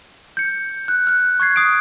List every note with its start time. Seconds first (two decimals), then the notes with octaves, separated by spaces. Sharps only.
0.37 G6 C#7
0.88 F#6
1.07 F6 F#6
1.40 C#6 F#6 G#6 C7
1.56 D#6 C7 D7